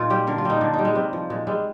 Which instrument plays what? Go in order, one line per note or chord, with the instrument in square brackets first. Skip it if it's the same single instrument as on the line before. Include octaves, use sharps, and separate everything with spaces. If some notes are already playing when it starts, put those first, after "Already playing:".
Already playing: [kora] A#2 D#4 F4
G3 G4
D3 A#4
F4
G3 D#4
D3 D4
D#4
G3
G#3
C3 G3
F3
A#2 G#3
G3 G#3